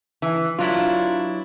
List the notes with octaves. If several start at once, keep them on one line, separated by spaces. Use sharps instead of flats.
E3
F#3 D4 E4 F4